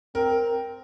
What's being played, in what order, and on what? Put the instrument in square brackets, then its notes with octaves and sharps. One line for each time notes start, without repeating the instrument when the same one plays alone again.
[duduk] C4 [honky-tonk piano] A#4